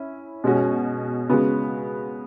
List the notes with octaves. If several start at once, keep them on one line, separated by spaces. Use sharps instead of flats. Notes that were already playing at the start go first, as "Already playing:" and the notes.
Already playing: C#4 E4
B2 G#3 C#4 F#4
C#3 G#3 B3 F#4